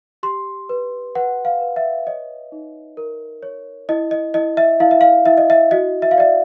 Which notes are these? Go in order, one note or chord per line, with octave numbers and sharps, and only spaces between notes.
G4 C6
B4
B4 F#5
F5
B4
E5
C#5 D#5
D#4
A#4
C#5
E4 D#5
D#5
E4 D#5
E5
E4 F5
E5
F5
E4 E5
D#5
E5
F#4 D#5
E5
F5
D5 E5